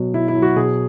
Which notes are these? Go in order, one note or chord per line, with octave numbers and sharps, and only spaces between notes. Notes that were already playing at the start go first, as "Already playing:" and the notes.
Already playing: B2 F#3
B2 E4
E4
F#3
F#4
B2 G#4